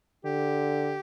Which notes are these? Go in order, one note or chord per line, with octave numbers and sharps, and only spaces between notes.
D3 G4